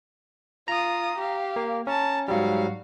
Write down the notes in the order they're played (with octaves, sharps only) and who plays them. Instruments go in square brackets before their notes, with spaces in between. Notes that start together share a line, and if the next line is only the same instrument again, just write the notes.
[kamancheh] F4 D#6 [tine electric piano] A#5
[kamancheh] G4 F5
[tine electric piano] A#3
[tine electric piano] C#4 [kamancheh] A5 A#5
[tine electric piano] G#2 F#3 G3 [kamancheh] F#4 F5